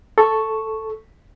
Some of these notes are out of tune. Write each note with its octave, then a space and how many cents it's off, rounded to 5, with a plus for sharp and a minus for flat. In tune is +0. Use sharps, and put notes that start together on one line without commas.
A4 +0 C#6 +0